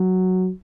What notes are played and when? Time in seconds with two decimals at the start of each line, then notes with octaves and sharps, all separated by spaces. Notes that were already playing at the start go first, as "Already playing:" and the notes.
Already playing: F#3